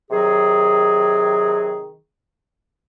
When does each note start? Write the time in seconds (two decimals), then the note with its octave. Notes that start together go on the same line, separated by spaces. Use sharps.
0.11 C3 D#3 F#3 G#4